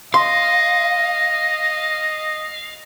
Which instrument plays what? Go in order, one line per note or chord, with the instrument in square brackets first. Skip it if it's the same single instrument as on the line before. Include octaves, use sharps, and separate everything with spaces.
[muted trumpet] D#5 [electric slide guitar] F5 [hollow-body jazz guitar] C6